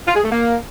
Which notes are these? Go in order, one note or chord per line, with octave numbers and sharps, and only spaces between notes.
F4
G#4
A3
A#3